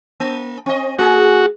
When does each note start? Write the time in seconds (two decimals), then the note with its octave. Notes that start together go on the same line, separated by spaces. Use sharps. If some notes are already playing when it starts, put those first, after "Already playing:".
0.20 A#3
0.66 C4 D#5
0.99 A3 F#4 G#4